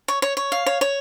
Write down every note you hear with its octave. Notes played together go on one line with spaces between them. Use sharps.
C#5
C#5
C#5
F5
C#5
C#5